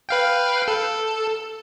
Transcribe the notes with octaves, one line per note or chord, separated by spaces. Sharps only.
B4 F5 G5
A4